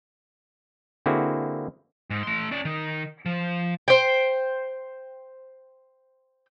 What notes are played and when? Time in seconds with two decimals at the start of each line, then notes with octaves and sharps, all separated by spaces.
1.06 D3 A#3 C4 E4 F#4 G#4
2.10 G#2
2.23 A3 C6
2.51 C#4 D5
2.65 D#3
3.26 F3
3.88 C5 G5